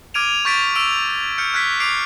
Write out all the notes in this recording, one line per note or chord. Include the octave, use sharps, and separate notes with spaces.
D6 F6 G#6 D7 D#7 F7
C#6 G6 A6 B6 D7
E6 D7 F7
F6 G6 C#7
F6 F#6 G#6 B6
D6 C7 D7 F7